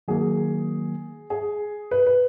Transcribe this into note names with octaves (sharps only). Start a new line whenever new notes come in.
D#3 F#3 A#3 G#4
G#4
B4
B4